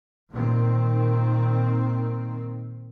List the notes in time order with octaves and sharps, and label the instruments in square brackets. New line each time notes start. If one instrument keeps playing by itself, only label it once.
[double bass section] A#2 D#3 C4